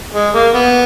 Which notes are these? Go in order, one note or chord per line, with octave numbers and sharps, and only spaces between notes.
G#3
A#3
B3